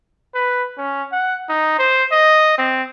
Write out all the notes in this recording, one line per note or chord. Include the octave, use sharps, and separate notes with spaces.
B4
C#4
F#5
D#4
C5
D#5
C4